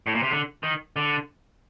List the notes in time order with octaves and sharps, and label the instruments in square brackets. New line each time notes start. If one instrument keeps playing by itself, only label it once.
[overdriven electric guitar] A2
A#2
C3
D3
D#3
D3